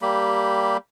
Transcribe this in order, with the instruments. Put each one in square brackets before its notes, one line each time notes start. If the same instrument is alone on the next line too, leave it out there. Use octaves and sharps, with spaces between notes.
[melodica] G3 A#3 G4 B5